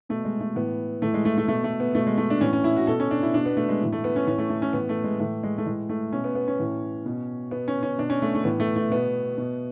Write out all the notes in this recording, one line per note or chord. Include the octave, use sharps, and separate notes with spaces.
B2 A3
G#3
A3
A2 E3 B3
A2 E3 A3
G#3
A3
A3
B2 A3
A3
B3
B2 A3
G#3
A3
D4
A2 E3 C#4
C#4
E4
F#4
B2 A4
C#4
D4
E4
B2 D4
B3
A3
G#3
A2 E3
A3
B3
C#4
A2 E3 C#4
A3
A3
C#4
A2 E3 B3
A3
G#3
A2 E3 A3
G#3
A3
A2 E3 G#3
A3
B2 C#4
B3
B3
C#4
A2 E3
B2
B2 B3
C#4
C#4
B2 D4
C#4
A3
A3
A2 E3 B3
A3
A3
B2 B3
B2